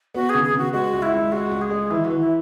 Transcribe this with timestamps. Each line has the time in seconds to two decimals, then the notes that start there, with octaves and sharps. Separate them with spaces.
0.14 B3 F#4
0.29 G#4
0.35 C#3
0.44 G#4
0.54 C#3 F#4
0.73 G#3 F#4
0.93 C#2
1.02 E4
1.12 C#2
1.32 G#3 F#4
1.51 C#2
1.61 G#4
1.70 G#3
1.91 E3 E4
2.05 F#4
2.10 E3
2.20 E4